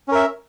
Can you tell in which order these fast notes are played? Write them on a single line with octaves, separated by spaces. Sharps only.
C#4 A#4 E5